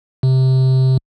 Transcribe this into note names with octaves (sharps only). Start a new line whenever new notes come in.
C3